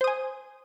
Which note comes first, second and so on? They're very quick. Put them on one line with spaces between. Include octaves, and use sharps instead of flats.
C5 D#6 G#5